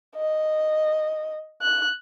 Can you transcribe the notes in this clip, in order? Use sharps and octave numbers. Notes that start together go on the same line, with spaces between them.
D#5
F#6